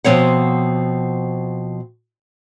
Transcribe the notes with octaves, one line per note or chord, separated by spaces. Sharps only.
B2 F3 C4 C#5 F#5